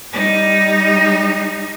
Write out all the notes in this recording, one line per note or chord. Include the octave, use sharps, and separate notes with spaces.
G3 D#4